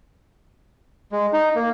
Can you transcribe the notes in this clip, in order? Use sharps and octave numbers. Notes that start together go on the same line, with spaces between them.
G#3
D#4
A#3